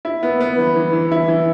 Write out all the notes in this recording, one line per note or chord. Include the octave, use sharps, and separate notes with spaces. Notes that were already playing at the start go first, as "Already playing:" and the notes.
E4
B3
B3
E3
E3
E3
E4
E3